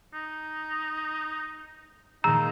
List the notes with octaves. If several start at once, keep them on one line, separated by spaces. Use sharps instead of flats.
D#4
A#2 D#3 G#3 D#4 A#5 E6